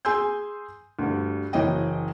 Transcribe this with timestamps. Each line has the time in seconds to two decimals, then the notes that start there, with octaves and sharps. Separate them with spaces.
0.05 G#4 G#5 C6 E6 G6
0.99 D2 G2
1.53 F#1 E3 F#3 C#4 D#5 G5